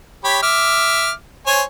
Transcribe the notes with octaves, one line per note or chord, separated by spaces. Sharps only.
G4 C#5 B5
E5 D6 F6
C5 C#5 G#5